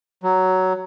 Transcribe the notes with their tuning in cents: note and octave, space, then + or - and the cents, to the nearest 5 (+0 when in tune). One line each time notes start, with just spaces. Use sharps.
F#3 +10